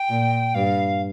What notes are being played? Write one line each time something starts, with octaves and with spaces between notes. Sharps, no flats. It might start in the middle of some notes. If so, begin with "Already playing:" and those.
Already playing: G5
A#2
G2 F5